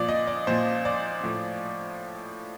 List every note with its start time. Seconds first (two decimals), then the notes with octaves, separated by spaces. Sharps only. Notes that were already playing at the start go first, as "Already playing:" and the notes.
Already playing: A#2 F3 D5
0.09 D#5
0.27 D5
0.47 A#2 F3 C5
0.85 D5
1.23 A2 F3